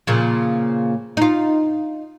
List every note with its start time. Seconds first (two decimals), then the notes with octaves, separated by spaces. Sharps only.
0.07 A#2 C#3 F3
1.17 D#4 F4